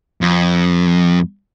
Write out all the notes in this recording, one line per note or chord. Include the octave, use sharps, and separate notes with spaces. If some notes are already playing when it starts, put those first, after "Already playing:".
F2